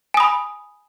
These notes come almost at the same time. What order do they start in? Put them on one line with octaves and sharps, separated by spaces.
G#5 D#6 B5